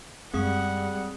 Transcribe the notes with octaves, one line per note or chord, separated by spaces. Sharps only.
F#2 G3 G#3 C4 G#4 F#5 D#6